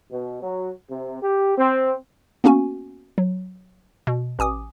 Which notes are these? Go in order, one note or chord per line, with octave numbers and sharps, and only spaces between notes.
B2
F#3
C3
G4
C4
A#3 B3 C#4 F#4 G#5
F#3
B2
A1 G#5 D6 D#6